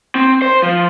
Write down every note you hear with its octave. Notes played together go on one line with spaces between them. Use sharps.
C4
C5
F3